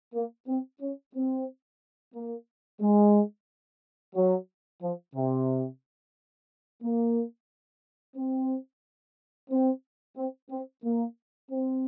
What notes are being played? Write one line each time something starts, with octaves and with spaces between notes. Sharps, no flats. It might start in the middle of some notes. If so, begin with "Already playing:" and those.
A#3
C4
C#4
C4
A#3
G#3
F#3
F3
C3
A#3
C4
C4
C4
C4
A#3
C4